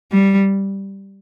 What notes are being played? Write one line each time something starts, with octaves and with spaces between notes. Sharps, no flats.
G3